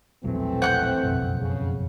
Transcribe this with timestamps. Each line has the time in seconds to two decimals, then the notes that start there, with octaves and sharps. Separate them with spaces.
0.24 E1 A#1 E3 F#3 A3 C4
0.62 F#5 F#6 G6
1.03 F#1 B1 F2
1.40 C#3